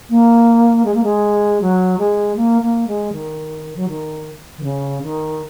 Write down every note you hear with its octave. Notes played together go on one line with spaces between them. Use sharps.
A#3
G#3
A#3
G#3
F#3
G#3
A#3
A#3
G#3
D#3
F#3
D#3
D#3
C#3
D#3